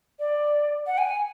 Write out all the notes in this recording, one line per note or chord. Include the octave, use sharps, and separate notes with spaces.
D5
F#5
G#5